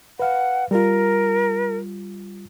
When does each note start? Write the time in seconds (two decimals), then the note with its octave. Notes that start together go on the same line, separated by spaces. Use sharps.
0.19 B4 F5 F#5
0.71 G3 F4 A#4